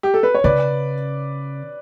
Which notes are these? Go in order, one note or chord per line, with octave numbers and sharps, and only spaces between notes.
G4
A4
B4
C#5
C#3 B4 D5